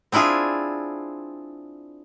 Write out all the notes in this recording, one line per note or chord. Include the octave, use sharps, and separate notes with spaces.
C4 D4 E4 F4 G#4